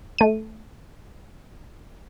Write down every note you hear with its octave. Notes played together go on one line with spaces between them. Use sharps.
A3 D#7